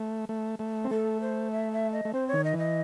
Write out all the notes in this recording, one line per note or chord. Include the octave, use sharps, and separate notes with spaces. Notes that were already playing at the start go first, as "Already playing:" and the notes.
Already playing: A3
A3
A3
C4
A3 A4
C5
E5
E5
D#5
A3
C4 C5
C#5
D#3
D#5
E3
D#5